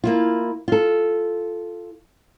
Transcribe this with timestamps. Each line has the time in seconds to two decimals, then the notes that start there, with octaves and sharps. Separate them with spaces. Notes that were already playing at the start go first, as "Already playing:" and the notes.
0.04 A#3 E4 F4
0.68 F4 A4